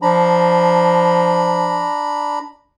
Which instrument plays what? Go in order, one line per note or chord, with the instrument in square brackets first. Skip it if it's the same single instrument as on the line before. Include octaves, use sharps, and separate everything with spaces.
[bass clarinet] F3 [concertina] D4 A#5 B5